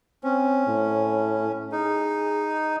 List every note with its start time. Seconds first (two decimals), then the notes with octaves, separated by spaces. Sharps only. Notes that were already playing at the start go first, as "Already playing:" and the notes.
0.24 C4 C#4
0.67 A2
1.72 D#4 G#4